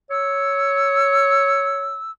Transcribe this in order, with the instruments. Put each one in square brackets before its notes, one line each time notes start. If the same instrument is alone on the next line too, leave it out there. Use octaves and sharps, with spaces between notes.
[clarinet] C#5 [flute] E6